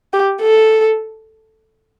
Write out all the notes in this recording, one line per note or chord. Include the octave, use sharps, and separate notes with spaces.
G4
A4